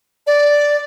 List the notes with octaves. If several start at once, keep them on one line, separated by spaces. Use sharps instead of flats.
D5